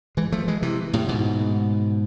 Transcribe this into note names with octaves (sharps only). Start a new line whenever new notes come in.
E3 G#3
F3 A3
E3 G#3
C3 E3
A2 C3
G#2 B2